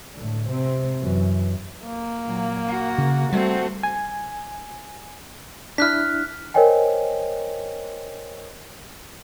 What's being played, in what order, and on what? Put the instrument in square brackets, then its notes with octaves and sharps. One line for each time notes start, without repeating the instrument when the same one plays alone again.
[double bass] A2 D3
C3 C4
F#2 E3
[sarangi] A#3
[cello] A#2 F#3
F#4
[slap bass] C#3
[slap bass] G3 [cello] A3 C4 [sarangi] F#4
[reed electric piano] G#5
[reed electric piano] D4 E4 [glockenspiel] F6 F#6 B6
[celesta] A#4 C5 C#5 D#5 G5 G#5